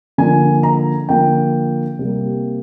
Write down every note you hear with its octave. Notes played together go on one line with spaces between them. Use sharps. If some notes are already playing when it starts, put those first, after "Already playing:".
D3 F3 A#3 G#5
A#5
D3 F3 A#3 G5
C3 G3 A#3